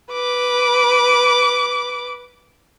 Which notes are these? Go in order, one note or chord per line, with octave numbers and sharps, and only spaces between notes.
B4 D6